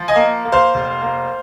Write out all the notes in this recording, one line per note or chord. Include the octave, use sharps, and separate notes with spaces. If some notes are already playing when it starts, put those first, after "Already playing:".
Already playing: F3
D#5 G#5
A#3
A#3
C5 F5
F1
A#3